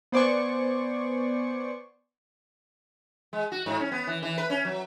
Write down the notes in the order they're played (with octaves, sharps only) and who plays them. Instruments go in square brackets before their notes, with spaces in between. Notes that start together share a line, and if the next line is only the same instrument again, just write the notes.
[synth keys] B3 C5 D5 G#5 C#6
[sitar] G#3
F#4
G#2
C#4
B3
E3
E3
B4
C#4
F#3